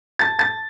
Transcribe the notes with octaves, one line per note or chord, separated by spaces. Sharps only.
A5 A6
A5 A6